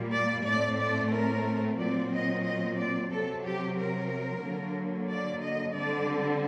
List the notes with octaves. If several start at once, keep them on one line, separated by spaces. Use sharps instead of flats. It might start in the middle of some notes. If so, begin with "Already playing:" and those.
Already playing: A#2 G3 A#3
D5
A2 A3 C4 D5
D5
A#4
A#2 F#3 C4 D5
D#5
D#5
D5
C3 F#3 C4 A4
G4
A#4
D3 F#3 A#3
D5
D#5
D3 G3 C4 D5